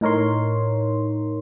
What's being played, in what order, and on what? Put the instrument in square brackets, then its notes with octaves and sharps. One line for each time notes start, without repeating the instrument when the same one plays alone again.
[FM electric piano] A2 D#4 A#4 C#5 C6